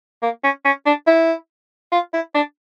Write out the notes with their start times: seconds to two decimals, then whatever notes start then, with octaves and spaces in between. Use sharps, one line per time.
0.22 A#3
0.44 C#4
0.65 C#4
0.86 D4
1.07 E4
1.92 F4
2.14 E4
2.35 D4